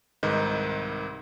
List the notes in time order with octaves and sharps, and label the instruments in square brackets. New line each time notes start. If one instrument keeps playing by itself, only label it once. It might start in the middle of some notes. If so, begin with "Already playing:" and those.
[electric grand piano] C2 G#2 D#3 D#4 B4